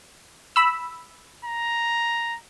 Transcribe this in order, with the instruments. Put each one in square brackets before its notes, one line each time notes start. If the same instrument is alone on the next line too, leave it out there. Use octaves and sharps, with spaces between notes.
[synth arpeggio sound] B5 E6
[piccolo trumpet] A#5